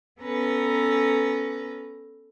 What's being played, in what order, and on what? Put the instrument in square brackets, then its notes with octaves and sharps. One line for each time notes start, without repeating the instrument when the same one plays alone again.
[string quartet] B3 C#4 A4 B4 A#5